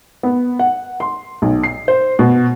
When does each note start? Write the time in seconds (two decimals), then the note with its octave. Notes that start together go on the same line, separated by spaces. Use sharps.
0.23 B3
0.59 F#5
1.00 C6
1.42 B1
1.63 C7
1.88 C5
2.19 B2